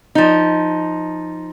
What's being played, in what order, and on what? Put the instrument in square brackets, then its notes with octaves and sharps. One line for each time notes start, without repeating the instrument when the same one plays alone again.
[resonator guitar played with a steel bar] F3 D#4